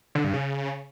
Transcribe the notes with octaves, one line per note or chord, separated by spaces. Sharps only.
D3
G2
C#3